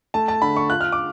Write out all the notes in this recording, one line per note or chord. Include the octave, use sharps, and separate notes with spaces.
A3 A5
A5
D3 B5
C#6
F4 F#6
F6
D6